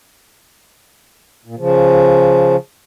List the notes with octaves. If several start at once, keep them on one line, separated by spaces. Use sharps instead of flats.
A#2
C#3 F3